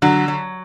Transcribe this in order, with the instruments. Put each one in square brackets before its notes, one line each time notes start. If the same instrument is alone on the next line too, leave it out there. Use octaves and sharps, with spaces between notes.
[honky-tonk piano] D3 [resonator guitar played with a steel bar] F#3
[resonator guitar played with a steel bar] F#3